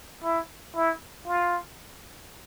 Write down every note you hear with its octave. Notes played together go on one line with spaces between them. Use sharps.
E4
E4
F4